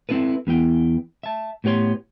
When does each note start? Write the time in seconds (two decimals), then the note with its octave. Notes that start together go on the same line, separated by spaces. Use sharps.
0.09 C4 E4 A4 B4
0.47 E2 B3 E4 G5
1.23 E5 A5
1.64 A2 B3 G4 C#5 C6